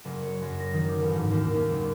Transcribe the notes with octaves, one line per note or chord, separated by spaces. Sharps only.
F#1
C#5
F#2
A#6
D#3
D6
A1
G#2
D#2
D#2
F#1